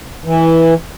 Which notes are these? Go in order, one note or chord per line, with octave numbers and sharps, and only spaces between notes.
E3